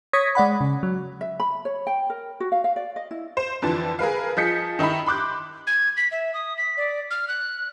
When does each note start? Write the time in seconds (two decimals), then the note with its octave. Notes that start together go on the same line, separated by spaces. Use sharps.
0.13 C#5 C#6 D#6 G#6 A#6 B6
0.35 G#3 D5 F#5 B5
0.61 C#3
0.83 F#3
1.21 E5
1.40 B5
1.65 C#5
1.87 G5
2.10 A#4
2.40 F#4
2.52 F5
2.64 F5
2.76 D5
2.96 D#5
3.11 E4
3.37 C5
3.62 F2 D3 E3 A5
3.99 G#4 A#4 B4 F5
4.37 F3 G#4 D#5 G6 B6 C#7
4.79 D#3 D#4 E4 E5 B5
5.06 B5 C6 D6 F#6 G6
5.67 G#6
5.97 B6
6.12 E5
6.34 D#6
6.58 B6
6.77 D5
7.11 F6
7.28 F#6